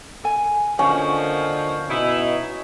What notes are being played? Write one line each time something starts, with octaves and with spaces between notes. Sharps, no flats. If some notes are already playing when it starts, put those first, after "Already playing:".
A4 G#5
A#2 D3 D#3 F3 C#4 F#4
B2 B3 D#4 E4